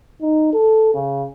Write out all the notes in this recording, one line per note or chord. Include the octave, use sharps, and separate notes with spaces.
D#4
A4
C#3